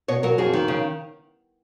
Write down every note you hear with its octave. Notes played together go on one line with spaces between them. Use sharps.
B2 C#5
F#3 A#4
F2 G#4
D#3
C#3